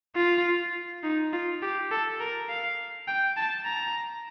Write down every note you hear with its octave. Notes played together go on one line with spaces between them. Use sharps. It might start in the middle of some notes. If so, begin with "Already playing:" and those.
F4
D#4
F4
G4
A4
A#4
F5
G5
A5
A#5